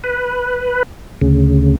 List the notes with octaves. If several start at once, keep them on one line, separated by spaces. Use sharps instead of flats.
B4
D2 C#3